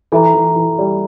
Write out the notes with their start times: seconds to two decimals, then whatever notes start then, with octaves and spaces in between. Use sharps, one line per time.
0.12 E3 A4 E5 A#5
0.34 E3
0.56 E3
0.78 G3